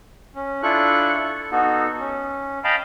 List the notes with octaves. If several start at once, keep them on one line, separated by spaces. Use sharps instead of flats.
C#4
D4 E4 F4 A4 C#6 F#6
A4
B3 D#4 F#4 A4
C#4
D#5 F5 G5 A5 B5